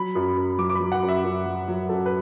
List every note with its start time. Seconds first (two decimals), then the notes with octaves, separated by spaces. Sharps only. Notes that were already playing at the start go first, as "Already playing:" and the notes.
Already playing: F#3 B5
0.15 F#2
0.37 F#2
0.58 F#3 D6
0.69 D6
0.75 B5
0.80 F#3
0.92 F#5
1.03 F#2
1.09 E5
1.24 F#2
1.46 F#3
1.68 F#3
1.89 F#2 A4
2.06 B4